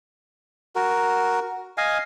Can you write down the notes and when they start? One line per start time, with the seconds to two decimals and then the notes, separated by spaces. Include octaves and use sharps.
0.76 F#4 A#4
1.78 D#5 F5 G#5